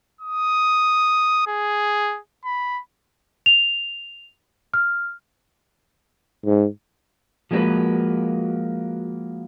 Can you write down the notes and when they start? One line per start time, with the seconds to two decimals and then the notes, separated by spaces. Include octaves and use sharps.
0.21 D#6
1.47 G#4
2.45 B5
3.46 F7
4.74 F6
6.46 G#2
7.51 F3 G#3 A#3 D4 F#4 B4